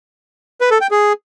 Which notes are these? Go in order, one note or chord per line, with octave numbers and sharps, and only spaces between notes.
B4
A4
G5
G#4